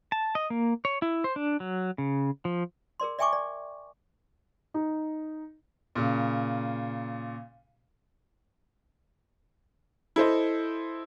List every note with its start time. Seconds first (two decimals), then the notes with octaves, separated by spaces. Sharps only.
0.12 A5
0.35 D#5
0.50 A#3
0.85 C#5
1.02 E4
1.24 C5
1.36 D4
1.60 F#3
1.98 C#3
2.45 F3
3.00 G#4 A#4 D5 C6
3.19 D5 E5 G5 G#5 C#6 D6
3.33 D5
4.74 D#4
5.95 A#2 C#3
10.16 E4 A4 C5 D#5